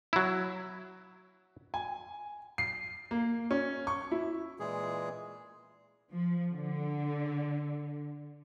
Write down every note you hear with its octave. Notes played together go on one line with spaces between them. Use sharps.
F#3 E4
G#5
C7
A#3
C#4
C#6
E4
A#2 E3 G#3 G#4
F3
D3